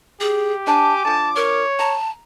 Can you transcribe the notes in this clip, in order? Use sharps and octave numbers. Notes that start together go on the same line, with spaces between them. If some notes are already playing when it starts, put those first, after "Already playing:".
G4 G#4
D4 C5 G#5 A5 D6
D3 F3 A5
A#4 C#5
A5 A#5